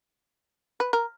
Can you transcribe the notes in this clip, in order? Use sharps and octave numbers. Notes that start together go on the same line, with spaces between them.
B4
A#4